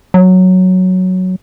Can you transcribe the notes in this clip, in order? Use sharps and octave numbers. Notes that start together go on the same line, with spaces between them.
F#3